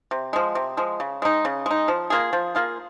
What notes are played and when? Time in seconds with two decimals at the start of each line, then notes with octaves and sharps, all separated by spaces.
0.11 C3
0.33 F3 G#3
0.55 C3
0.77 F3 G#3
1.00 C#3
1.22 G#3 D#4
1.45 C#3
1.66 G#3 D#4
1.88 F3
2.10 A#3 F4 G#4
2.33 F3
2.55 A#3 F4 G#4